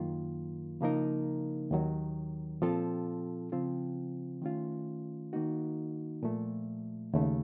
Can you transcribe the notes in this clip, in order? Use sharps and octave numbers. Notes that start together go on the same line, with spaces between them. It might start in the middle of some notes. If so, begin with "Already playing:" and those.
Already playing: F#2 D#3 F#3 A#3 F4
C#3 F3 A#3 D#4 A#4
D#2 D#3 F#3
A#2 F3 C4 F4 A4
C#3 F3 C4 F4
D#3 A3 C#4 F4
D#3 A#3 D#4 F#4
A#2 F3 A3
D#2 C#3 A3